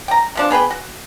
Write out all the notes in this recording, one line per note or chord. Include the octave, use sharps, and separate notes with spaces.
G5 A#5
C3 F3 D4
B3 G#4 B4 G5
F#4